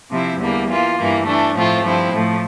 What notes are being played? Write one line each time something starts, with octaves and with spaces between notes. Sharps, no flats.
C3 F3 C4 E4
E2 D3 G3 A#3
E3 A#3 F4
G2 E3 A#3
E3 A3 D4
A2 F3 A3 C4 F4
G2 F3 C4 E4
A2 F3 A3